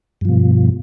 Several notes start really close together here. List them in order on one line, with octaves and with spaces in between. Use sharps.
G2 F3 B2